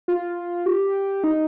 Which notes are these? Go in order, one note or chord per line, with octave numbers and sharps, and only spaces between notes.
F4
G4
D#4